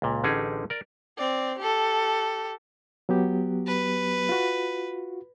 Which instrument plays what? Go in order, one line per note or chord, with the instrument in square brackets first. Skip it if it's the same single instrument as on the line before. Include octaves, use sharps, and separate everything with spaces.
[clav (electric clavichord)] C#2 A#2
A1 D3 C#4 D#4 G4 G#4
A#4 D5
[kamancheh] C4 D5
G4 A4
[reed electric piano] F#3 B3 G4
[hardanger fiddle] B4
[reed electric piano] F4 F#4